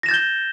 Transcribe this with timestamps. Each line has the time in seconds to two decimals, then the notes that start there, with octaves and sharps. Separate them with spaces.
0.03 A#6
0.06 E7
0.09 A6
0.11 G6
0.14 G7